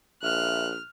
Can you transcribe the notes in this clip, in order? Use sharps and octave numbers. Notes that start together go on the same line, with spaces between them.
A#1 E5 F6 F#6